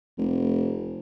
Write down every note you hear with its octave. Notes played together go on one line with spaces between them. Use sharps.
F1